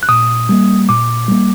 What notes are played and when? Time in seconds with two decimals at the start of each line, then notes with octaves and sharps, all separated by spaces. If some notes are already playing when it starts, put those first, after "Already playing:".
0.03 F#6
0.09 A#2 D#6
0.49 G3 A#3
0.89 A#2 D6
1.28 G3 A#3